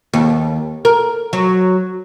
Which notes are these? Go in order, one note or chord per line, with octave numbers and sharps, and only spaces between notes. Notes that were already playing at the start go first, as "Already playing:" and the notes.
D#2
A#4
F#3